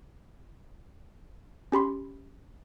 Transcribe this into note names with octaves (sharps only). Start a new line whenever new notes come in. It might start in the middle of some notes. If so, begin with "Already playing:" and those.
C#4 G4 B5 C6